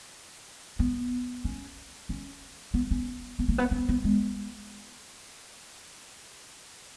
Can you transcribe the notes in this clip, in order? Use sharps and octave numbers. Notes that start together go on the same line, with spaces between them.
B3
C#4
C#4
B3
C#4
B3
A#3
B3
C#4
B3
G#3